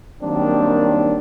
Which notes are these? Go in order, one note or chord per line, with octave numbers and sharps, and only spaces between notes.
D#3 F#3 G3 A#3 C4 D4